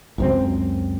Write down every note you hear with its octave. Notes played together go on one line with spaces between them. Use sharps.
C#2 F#2 C4